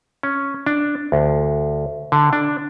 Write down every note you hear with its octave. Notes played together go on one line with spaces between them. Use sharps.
C#4
D4
D2
D3
D4